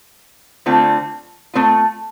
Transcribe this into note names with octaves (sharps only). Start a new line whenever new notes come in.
D3 A3 C4 F4
A3 C4 F4